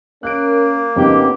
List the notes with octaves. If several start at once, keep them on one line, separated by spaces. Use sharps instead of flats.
A#3 C#4 A#4 F#6 D7
F2 C#3 B3 C#4 D#4 G4